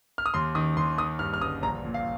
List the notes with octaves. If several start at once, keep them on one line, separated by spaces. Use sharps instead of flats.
F6
D#6
D#2 C6
D#3 D#6
D#2 C6
D#3 D#6
G2 F6
F6
G1 D#6
A#1 A#5
A#2
F5